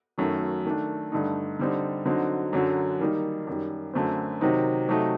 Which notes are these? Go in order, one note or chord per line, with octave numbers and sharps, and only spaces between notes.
F#2 D#3 F#3 A3
D#3 A3 D4
G2 D3 A3 D#4
D3 G3 C4 D#4
D3 F#3 C4 D#4
F#2 D3 F#3
D#3 G3 A#3 D#4
F#2 D#3 G3
F#2 D3 A3 C4
C3 D#3 F#3 C4 D#4
C3 F#3 A3 D#4